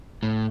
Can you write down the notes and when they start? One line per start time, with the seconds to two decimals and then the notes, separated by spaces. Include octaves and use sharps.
0.23 A2